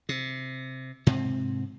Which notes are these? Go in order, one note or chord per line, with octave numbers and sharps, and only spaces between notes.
C3
G#2 C3 C4